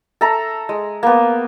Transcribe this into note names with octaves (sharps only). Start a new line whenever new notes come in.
A4 E5 A#5
G#3
A#3 B3